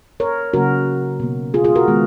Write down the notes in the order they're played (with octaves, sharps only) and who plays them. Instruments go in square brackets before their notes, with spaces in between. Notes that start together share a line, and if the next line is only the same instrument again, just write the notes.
[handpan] A#4 C#5
C#3 F#3 A#3 F#4 A#4
B2 A#3
F4 G#4
F4 G#4
F#4 A#4
D#3 G#3 B3